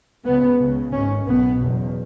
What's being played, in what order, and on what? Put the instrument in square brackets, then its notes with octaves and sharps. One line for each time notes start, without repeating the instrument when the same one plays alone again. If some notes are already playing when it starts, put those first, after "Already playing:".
[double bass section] C#2 C#3 B3
C#2 C#3
G#1 G#2 C#4
B1 B2 B3
F#1 E2 B2